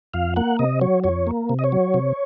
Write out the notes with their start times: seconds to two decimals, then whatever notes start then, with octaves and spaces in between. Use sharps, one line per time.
0.14 F2 F5
0.36 A#3 F#5
0.59 C3 D#5
0.81 F#3 C#5
1.04 F2 C#5
1.27 A#3
1.49 C3
1.59 D#5
1.64 C#5
1.72 F#3
1.94 C3